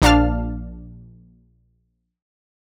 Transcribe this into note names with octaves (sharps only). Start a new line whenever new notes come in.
A#1 D4 F5 A5 F6